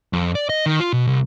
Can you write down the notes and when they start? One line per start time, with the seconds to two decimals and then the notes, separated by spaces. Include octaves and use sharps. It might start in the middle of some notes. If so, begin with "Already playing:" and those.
0.13 F2
0.35 D5
0.49 D#5
0.66 D#3
0.80 F4
0.93 B2
1.07 C2